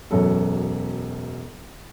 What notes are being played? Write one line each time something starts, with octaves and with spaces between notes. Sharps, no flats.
E1 F#2 F#3 A4